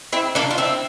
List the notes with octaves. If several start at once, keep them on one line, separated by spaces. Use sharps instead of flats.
C4 E4
A#3 D4
F4
C4 E4